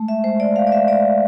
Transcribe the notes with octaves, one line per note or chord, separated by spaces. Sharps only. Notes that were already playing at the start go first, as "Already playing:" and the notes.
Already playing: G#3 A3
E5
G#3 C5
D5
G#3 F5
D5
E5
G#3 D5